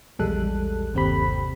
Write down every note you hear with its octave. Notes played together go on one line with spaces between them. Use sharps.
A#1 E2 G3 G#3 A4 F#6
G1 D#2 C3 C4 G4 B5